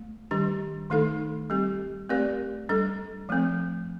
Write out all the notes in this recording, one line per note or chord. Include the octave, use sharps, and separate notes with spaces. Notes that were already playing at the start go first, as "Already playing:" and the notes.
Already playing: A3
D#3 G3 D4 G4
D#3 A3 D#4 A4
G3 C4 G4
A3 C4 G4 A#4 D5
G3 D4 A4
F3 A3 C4